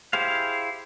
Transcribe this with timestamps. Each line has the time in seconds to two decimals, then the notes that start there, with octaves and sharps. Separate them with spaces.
0.13 E4 G4 G#4 C5 F5